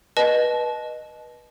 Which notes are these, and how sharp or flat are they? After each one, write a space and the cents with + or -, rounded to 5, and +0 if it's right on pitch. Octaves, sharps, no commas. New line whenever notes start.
B4 -25 D#5 -15 A5 -30